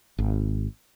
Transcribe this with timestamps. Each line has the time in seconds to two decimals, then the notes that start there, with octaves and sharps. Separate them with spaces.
0.18 G#1